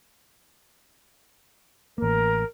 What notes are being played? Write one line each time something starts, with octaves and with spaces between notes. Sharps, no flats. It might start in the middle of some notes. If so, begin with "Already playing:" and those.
A1 A#3 A#4